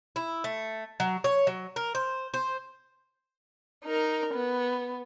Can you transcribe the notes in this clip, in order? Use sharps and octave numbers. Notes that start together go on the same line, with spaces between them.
E4
A3
F#3
C#5
F#3
A#4
C5
C5
D#4 A#4
B3